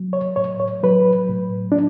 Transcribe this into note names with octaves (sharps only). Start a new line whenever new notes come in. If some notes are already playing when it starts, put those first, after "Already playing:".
Already playing: F#3
C#5
A2 C#5
C#5
F#3 B4
A2
D4